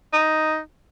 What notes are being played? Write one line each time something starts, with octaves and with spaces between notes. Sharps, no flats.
D#4